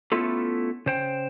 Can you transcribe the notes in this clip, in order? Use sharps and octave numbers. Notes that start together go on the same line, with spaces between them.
A3 B3 C#4 E4 F4 A4
C#3 C5 G5